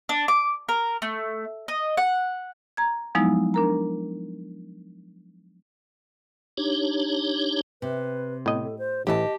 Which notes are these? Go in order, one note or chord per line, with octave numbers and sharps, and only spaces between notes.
D4
D6
A#4
A3
D#5
F#5
A#5 G#6
F3 F#3 G#3 B3 D#4 E4
D4 A#4 A#5
D4 D#4 G4 C#5
C3 B4
A2 B3 D#5
A4
C5
A1 E3 G4 D#5 A5